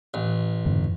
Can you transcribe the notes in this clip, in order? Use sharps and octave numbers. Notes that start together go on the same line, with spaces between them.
A1
F2 G#2 D3